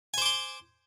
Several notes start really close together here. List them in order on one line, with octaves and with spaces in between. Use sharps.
G#5 C5 D6 C6